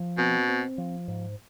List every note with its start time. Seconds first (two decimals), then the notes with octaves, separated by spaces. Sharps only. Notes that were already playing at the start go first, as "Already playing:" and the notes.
Already playing: F3
0.18 B2 C4
0.48 C4
0.78 F3
1.08 G#2